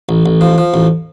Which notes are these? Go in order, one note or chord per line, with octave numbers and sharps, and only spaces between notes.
A1
A1
F3
F3
A1